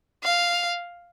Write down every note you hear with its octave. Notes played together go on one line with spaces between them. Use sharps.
F5